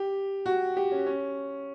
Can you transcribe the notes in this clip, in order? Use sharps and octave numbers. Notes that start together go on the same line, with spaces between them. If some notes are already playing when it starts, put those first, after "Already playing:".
Already playing: G4
F#4
G4
C#4
C#4